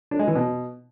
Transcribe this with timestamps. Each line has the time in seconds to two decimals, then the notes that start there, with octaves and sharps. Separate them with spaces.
0.11 D4
0.19 G#3
0.27 E3
0.35 B2